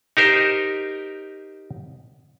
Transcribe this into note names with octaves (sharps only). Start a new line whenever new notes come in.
D#4 G4 A#4 C5